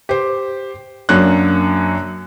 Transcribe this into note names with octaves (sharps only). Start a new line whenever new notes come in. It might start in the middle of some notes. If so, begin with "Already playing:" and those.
G4 C5
F#2 F#3 A#3 D4 C#5 F#6